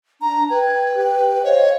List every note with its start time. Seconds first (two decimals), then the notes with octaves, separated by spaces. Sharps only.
0.22 D4 A#5
0.50 B4 G5 G#6
0.96 G4 G5
1.44 C5 C#5 D#5 F5